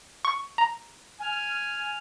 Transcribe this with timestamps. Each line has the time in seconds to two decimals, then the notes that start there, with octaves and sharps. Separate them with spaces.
0.25 C#6
0.58 A#5
1.20 G#5 F6